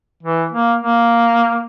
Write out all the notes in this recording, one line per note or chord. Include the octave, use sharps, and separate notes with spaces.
E3
A#3
A#3